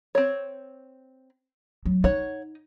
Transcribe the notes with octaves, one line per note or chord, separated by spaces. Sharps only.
C4 C#5
F#3
D#4 C#5 F#5